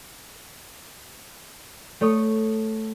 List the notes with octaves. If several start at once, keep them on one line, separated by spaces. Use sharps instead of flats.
A3 C#5 D#6